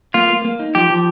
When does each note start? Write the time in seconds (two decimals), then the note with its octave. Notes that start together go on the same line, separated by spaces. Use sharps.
0.14 A#3 F4
0.30 A#3
0.45 A#3
0.59 D#4
0.75 F3 G4
0.90 F3